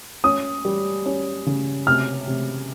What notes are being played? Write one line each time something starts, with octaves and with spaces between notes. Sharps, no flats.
C#4 D#6
G3
C#4
C#3
C3 F6
C3